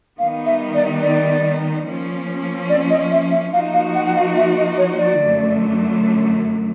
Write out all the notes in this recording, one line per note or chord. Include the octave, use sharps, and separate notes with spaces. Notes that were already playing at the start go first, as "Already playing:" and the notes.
D#3 G3 B3 D#4 F5
E5
D5
D5
F3 A#3 C#4
D5
D#5
E5
E5
F3 A#3 D#4 F#4 F5
F5
F#5
F#5
F5
E5
D#5
C#5
D5
F#2 D3 F#3 A3